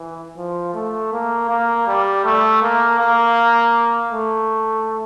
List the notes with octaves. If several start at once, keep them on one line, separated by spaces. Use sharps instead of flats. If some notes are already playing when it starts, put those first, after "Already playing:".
Already playing: E3
F3
A3
A#3
A#3
G3
A3
A#3
A#3
A3